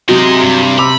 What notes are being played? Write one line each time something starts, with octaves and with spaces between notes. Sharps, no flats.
C3 F#3 G#3 D#4
G2
B5 D6 E6 F7